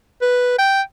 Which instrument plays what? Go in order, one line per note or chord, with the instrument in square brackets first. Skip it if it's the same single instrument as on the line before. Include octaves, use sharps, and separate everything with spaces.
[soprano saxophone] B4
G5